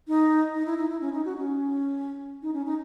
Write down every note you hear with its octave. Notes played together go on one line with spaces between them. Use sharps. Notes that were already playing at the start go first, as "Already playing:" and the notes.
D#4
D#4
E4
D#4
E4
C#4
D#4
F#4
C#4
D#4
C#4
D#4